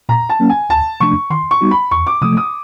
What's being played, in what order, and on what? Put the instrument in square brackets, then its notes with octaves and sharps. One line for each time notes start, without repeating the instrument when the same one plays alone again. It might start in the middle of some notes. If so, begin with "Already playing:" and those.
[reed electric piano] A#2 [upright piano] A#5
[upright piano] A5
[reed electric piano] F#3 A#3 C#4
[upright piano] G#5
[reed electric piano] D2 [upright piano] A5
[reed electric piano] C3 F3 A3 D4 [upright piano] C#6
[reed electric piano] D#3 [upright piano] C6
[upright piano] C#6
[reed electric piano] G3 B3 D#4 F#4
[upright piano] B5
[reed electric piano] E2 [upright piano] C#6
[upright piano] D6
[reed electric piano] C3 F3 A3 [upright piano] D#6
[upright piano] D#6